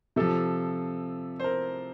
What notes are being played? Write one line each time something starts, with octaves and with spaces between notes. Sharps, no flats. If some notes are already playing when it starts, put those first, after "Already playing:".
C3 F3 A4
C5
A#4